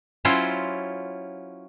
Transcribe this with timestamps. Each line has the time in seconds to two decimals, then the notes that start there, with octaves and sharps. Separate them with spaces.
0.25 F#3 C#4 E4 F4 C5